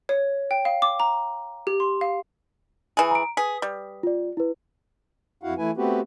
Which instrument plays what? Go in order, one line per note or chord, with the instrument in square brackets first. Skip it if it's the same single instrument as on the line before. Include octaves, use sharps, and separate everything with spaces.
[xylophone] C#5
G5
F5
D6
A#5
G4
C6
F5
[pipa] E3 G#4
[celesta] A#5 D7
[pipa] G#4 [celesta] B4 D#6 B6
[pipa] G3
[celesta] F4 D5
E4 B4
[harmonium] F2 E4 F#4 F5 F#5
E3 A3 E4 B4 G#5
A3 B3 C4 F#4 G4 B4